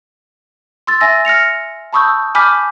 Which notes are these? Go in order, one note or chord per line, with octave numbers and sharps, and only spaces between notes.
C6 E6 A6
E5 G#5 E6 A#6
F6 A#6 C#7 F7
A5 B5 C#6 D#6 E6 G6
G#5 B5 D6 F6 G6 B6